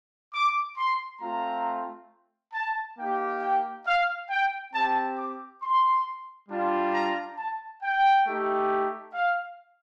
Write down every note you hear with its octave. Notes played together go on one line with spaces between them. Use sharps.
D6
C6
A3 C4 F4 A#5
A5
A#3 D#4 G4 G5
G5
F5
G5
C4 G4 A5
D6
C6
G3 D4 F4
A#5
A5
G5
A3 D#4 G4
F5